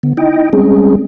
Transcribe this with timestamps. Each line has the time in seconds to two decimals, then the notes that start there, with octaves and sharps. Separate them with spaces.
0.03 D3 B3
0.17 D#4 E4 D#5 G5
0.53 G3 G#3 C4 C#4 G#4